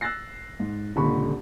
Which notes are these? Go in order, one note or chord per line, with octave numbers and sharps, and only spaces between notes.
E6 F#6 A6 A#6 C7
G#2
D#1 C#2 A#2 D3 B5 C#6